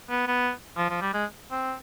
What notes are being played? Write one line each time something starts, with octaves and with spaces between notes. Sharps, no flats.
B3
B3
F3
F3
G3
G#3
C4